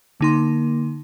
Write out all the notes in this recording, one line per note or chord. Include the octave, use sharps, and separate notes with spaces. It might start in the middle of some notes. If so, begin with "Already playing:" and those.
D3 A#3 D#4 C6